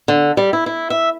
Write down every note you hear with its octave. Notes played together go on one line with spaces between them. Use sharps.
D3
G3
E4
E4
E5